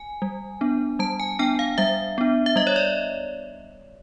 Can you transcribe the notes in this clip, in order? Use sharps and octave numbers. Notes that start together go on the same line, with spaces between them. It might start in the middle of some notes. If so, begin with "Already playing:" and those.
Already playing: G#5
G3
B3 D4
G3 A5
G#5
B3 D4 G5
F5
G3 E5
B3 D4
E5
G3 D#5
C#5
D5